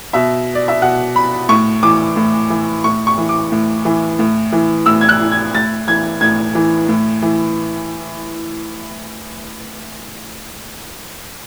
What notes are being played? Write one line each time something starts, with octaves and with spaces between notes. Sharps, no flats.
B2 E5
D5
E5
B2 F#5
B5
A2 C#6
E3 D6
A2
E3
A2 C#6
C#6
E3
D6
A2
E3
A2
E3
A2 E6
G#6
F#6
E3
G#6
A2 A6
E3 G#6
A2 G#6
E3
A2
E3